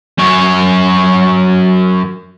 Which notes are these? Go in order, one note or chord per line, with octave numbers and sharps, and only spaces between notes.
F#2 C#5